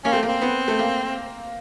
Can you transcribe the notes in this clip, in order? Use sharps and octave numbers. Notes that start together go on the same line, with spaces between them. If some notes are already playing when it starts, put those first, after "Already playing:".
A#3 C#4
A3 C4
A#3
C4
B3
A3
A#3